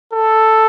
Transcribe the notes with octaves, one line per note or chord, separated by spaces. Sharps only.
A4